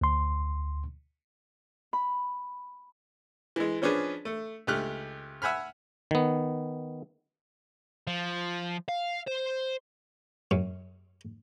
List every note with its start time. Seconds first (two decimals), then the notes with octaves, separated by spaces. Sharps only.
0.01 D2 C6
1.93 B5
3.56 E3 G#3
3.82 F3 C#4 D4 G#4 B4
4.25 A3
4.67 C#2 A3 G4 F6 F#6
5.42 E5 F#5 G#5 B5 F6
6.11 D#3 B3
8.07 F3
8.89 F5
9.27 C5
10.51 F#2